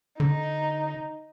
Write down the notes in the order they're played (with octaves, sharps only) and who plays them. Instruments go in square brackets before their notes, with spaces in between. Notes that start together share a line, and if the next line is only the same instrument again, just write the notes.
[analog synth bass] D3 [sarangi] D#4